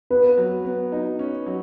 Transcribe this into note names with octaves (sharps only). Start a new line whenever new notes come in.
B3 B4
F#3
B3
D#4
C#4
F#3